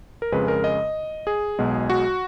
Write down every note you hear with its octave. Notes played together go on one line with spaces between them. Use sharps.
A#4
F2 C#3 G#3 B4
A#4
D#5
G#4
B1 B2 G#3
F#4